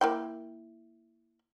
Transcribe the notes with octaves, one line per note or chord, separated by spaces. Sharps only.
A#3 E4 G5